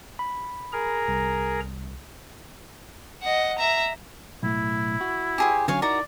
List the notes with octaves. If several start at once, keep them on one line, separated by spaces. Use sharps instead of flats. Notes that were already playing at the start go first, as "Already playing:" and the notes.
B5
G#4 A#4 A#5
C2
D#5 F#5
E5 A#5
B1 A2 E4
F#4
G4 G#4 C5
D3 F#3 C#4 C#5 F5 G#5
D#4 E4 F#4 A#4 D5 A#5